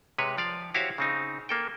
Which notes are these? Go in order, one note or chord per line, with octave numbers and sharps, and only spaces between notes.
C3 G#3 B4 C#5
F3 D5 F5
E4 F#4 G4 C5 C#5 F5
C#3 C4 D#4
A#3 A4 G5